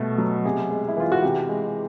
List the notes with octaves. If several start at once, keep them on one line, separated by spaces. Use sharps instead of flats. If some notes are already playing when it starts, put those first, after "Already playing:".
Already playing: B2 G3 A3 A4
F#3
C3 G#4
G#3
E4
E3 F4
F#4
C3 G4
G#3